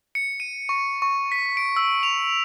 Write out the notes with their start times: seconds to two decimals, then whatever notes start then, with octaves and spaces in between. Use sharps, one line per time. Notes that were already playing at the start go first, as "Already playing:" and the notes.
0.15 C#7
0.40 D#7
0.69 C#6
1.02 C#6
1.32 B6
1.57 D7
1.76 E6
2.03 F7